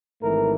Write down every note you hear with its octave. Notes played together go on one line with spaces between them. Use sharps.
G#1 G#2 E3 A3 A#4